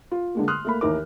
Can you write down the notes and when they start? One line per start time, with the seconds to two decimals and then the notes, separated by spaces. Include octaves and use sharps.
0.11 F4
0.35 D3 G#3 A#3
0.48 C6 D#6 F6 F#6
0.65 A3 A#3 B5
0.81 D#2 E3 D#4 A#4 D6